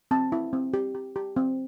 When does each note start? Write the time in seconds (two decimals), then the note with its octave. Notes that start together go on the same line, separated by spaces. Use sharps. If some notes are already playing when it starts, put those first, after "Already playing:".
0.11 C4 A5
0.32 E4
0.53 C4
0.74 G4
0.95 G4
1.16 G4
1.36 C4